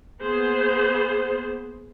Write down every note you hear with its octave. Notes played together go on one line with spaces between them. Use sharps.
A#3 B3 G#4 C5